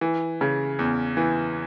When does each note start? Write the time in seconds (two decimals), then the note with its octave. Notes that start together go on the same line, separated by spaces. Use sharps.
0.01 E3
0.41 C#3
0.79 E2
1.17 E3